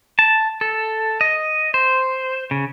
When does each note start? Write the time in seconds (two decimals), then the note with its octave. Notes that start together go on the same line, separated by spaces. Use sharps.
0.19 A5
0.61 A4
1.21 D#5
1.74 C5
2.51 C#3